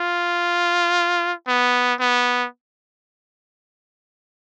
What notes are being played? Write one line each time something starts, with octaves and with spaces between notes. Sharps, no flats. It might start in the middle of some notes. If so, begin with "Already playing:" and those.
Already playing: F4
B3
B3